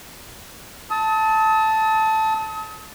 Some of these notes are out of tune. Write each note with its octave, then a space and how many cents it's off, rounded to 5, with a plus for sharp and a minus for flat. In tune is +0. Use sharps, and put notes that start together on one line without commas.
A5 +0 D#6 +40